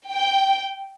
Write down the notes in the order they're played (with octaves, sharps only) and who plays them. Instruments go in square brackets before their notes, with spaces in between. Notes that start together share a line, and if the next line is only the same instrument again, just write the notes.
[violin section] G5